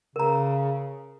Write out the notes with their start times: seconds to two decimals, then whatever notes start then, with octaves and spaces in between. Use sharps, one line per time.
0.16 C#3 A#4 A#5